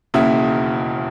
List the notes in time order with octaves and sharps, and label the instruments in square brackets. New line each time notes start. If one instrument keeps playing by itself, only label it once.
[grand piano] E1 D#2 C#3 E4